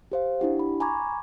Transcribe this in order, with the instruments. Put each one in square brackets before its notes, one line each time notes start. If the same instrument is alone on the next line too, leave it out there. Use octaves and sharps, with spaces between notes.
[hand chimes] G4 C5 F5
D4 E4 G4 F#5
B5
G#5 A#5 B5 C#6 D6 G#6